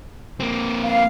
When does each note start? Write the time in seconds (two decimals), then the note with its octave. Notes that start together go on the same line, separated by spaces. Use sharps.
0.40 A#3 C4
0.84 F5